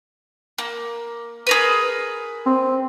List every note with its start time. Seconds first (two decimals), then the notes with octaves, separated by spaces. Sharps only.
0.58 A#3
1.47 G#4 A#4 B4
2.46 C4